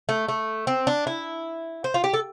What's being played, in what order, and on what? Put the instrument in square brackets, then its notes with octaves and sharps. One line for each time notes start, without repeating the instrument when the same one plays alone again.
[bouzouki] A3
A3
C4
D4
E4
C5
F4
G4
A4